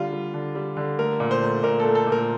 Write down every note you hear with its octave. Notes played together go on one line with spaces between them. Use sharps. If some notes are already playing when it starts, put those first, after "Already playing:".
Already playing: D3 G3 F4
G3
D3
G3
D3
A3 A#4
A#2
C5
A3
A#2 A#4
A4
A3
A4
A#2
A#4